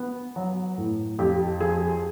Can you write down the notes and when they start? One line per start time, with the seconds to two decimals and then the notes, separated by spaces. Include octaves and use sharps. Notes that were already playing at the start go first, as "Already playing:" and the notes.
Already playing: B3
0.36 F#3
0.78 A2
1.19 F2 G4
1.60 F3 G#4